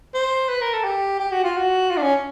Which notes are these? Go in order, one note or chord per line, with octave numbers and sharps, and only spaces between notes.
C5
B4
A#4
A4
G4
G4
F#4
F4
F#4
F4
D4
C#4